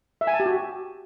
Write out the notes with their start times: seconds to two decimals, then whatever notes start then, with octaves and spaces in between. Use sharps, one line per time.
0.21 E5
0.27 G#5
0.34 A5
0.40 G4
0.46 F#4